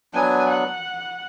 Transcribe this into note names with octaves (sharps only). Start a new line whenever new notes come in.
F#3 B3 D4 G#5
F#5